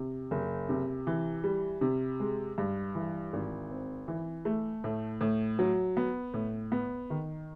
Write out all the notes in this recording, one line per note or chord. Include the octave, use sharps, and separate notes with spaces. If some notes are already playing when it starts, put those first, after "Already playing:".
Already playing: C3
F#1
C3
E3
G3
C3
G#3
G2
E3
G#1
C4
E3
A3
A2
A2
F#3
B3
A2
B3
D#3